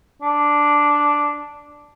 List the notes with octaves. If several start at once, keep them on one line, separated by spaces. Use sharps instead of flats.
D4